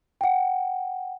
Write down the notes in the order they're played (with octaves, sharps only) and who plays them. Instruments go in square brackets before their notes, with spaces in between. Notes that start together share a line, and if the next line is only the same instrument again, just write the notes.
[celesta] F#5 G5